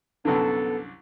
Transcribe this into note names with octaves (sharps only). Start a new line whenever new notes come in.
C2 F#2 D3 B3 A4